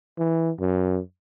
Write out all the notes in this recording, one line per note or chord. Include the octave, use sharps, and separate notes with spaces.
E3
F#2